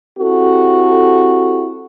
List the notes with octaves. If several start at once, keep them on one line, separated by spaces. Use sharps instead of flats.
C4 E4 F#4 G4 A4